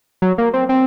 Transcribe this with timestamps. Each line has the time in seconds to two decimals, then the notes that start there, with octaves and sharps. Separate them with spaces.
0.22 F#3
0.38 A#3
0.54 C4
0.69 C4